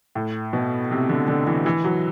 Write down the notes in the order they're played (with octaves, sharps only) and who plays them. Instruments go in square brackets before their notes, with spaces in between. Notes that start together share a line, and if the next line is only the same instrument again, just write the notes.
[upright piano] A2
B2
C3
D3
D3
E3
E3
F#3